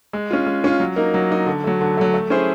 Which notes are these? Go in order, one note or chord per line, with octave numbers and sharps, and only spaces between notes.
G#3
C#4 F4
G#3
C#4 F4
F#3
A#3 D#4
F#3
A#3 D#4
D3
F#3 A3
D3
F#3 A3
A3
C#4 E4 G#4 C5